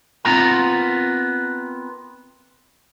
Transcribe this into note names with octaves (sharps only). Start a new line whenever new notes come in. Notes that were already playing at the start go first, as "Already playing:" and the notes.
B3 C4 D#4 F4 A#4 A#5